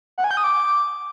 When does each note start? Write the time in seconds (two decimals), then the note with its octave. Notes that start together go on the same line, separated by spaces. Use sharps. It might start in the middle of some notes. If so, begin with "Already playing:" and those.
0.18 F#5
0.24 G#5
0.31 G6
0.37 D#6
0.44 D6